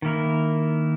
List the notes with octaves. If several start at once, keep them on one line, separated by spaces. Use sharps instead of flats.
D#3 A#3 E4 A#4